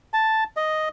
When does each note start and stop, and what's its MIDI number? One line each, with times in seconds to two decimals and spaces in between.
0.14 0.44 81
0.57 0.89 75